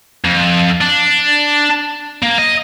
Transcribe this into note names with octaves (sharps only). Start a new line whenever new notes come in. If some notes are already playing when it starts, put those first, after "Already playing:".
F2
D4
A#3
D#5